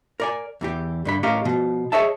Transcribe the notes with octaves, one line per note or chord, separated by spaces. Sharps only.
A#4 D5 G#5
E2 E3 G4
G2 D3 B5
A2 C#4 G4 A#4 D#5 F5
B2 F3
G#4 C5 C#5 D#5 E5 A5